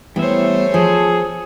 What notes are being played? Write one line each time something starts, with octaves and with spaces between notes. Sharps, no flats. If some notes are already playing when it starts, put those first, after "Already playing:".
E3 G3 A3 B3 C5 C#5 E5
F3 G#4 A4